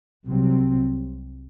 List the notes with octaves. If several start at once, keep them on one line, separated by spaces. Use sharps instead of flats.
C2 C3 F#3 C4